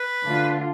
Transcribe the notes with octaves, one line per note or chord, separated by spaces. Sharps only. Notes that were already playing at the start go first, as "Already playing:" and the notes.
Already playing: B4
D3 A3 D4 F4